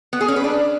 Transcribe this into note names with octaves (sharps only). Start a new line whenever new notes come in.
B3
G#4
C#4
B4
D4